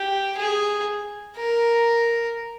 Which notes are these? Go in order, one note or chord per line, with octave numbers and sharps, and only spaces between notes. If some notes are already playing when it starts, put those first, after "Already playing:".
Already playing: G4
G#4
A#4